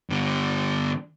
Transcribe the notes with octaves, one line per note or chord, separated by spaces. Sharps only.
G2 D3